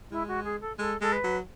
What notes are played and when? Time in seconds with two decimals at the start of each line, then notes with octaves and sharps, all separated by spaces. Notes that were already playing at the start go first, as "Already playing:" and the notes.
0.11 G#3 E4
0.28 F#4
0.44 G#4
0.61 A4
0.78 G#3 A4
1.01 G#3 A4
1.12 B4
1.24 F#3